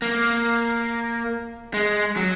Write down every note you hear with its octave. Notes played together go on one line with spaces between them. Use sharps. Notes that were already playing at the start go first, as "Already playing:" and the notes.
A#3
G#3
F#3